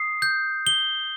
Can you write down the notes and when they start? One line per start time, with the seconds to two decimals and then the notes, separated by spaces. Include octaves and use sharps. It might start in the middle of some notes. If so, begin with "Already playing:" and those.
Already playing: D#6 C7
0.22 G6
0.67 G7